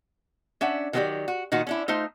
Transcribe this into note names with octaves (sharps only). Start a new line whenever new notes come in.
C#4 D4 E5 F#5
D#3 F#3 C4 D4 G4 D5
F#4
A#2 D#3 D#4 F#4
C#4 D4 E4
A3 D#4 F4 C5